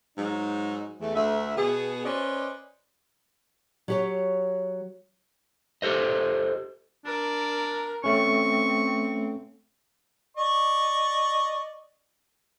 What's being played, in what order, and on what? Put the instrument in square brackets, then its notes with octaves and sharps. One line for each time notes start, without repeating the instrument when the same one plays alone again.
[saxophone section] G#2 F#3 D#4
E2 A3
D2 E5
B2 B3 G#4
C#4 B4 C5 D5 D#5
[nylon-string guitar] F#3 G4 C#5
[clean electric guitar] G4 A4 C5 D#5
[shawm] D4 [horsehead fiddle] A#4
[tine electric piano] A3 C#4 [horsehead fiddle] C4 [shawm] C#6
[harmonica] D5 D#5 C#6